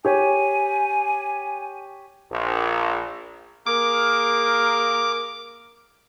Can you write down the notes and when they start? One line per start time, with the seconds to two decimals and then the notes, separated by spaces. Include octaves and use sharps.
0.05 G4 C#5 G#5
2.32 A#1
3.67 A#3 G#4 A#4 D6